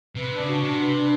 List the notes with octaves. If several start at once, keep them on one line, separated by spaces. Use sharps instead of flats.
C3 B4
D4
C#3
F#4
C3 D4
B4
D4